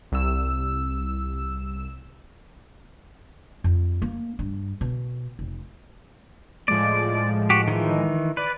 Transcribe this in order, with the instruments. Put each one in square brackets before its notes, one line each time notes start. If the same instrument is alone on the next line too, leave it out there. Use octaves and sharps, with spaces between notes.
[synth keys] C2 E6
[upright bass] F2
A#3
G2
B2
F1
[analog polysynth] A2 F3 G#3 [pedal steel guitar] D5
[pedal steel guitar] F#4 G4
D#3 E3
[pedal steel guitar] B4 [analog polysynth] D5